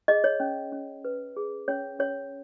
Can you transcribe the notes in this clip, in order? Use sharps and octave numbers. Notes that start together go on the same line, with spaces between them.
G#4 D#5
C#5
C#4
C#4
B4
G#4
C#4 C#5
C#4 C#5